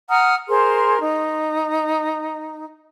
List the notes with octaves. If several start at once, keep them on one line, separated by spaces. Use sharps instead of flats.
F#5 A#5 D#6 F6
G#4 A#4 C5 C6
D#4